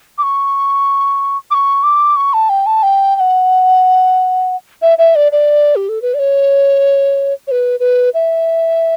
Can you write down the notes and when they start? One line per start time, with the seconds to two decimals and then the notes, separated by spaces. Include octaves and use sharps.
0.18 D6
0.23 C#6
1.51 D6
1.54 C#6
1.83 D6
2.16 C#6
2.33 A5
2.49 G5
2.66 A5
2.83 G5
3.16 G5
3.20 F#5
4.82 E5
4.98 E5
5.15 D5
5.32 D5
5.76 G4
5.89 A4
6.02 B4
6.14 D5
6.19 C#5
7.47 C#5
7.51 B4
7.80 B4
8.14 E5